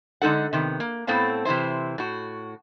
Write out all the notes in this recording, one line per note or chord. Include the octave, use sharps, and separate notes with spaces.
D3 G#3 D#4 A4 F#5
C3 D#3 B3
A#3
A2 B3 C4 A4 F5 A5
C3 E3 D4 E4 C5
A2 F#4